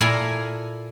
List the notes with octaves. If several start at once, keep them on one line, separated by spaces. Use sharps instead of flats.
A#2 E4 A4 A#4 G#5 A#5